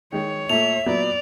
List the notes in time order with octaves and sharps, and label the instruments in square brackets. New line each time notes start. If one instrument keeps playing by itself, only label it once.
[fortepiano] D#3 G#3 [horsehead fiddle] C#5
[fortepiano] A#2 A3 [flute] E5 [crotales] F7
[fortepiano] A#2 F#3 B3 [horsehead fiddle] D5